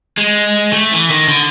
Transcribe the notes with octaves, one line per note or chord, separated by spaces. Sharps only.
G#3
A3
E3
D#3
D3